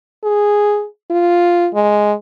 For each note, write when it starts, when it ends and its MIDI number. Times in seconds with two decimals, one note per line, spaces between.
0.24 0.86 68
1.11 1.69 65
1.74 2.13 56